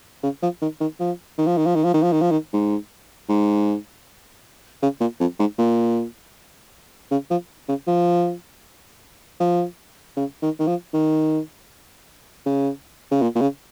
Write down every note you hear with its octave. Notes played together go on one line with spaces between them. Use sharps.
C#3
F3
D#3
D#3
F3
D#3
F3
D#3
F3
D#3
F3
D#3
F3
D#3
F3
D#3
G#2
G#2
C#3
A#2
F2
G#2
A#2
C#3
F3
C#3
F3
F3
C#3
D#3
D#3
F3
D#3
C#3
C#3
A#2
A#2
C#3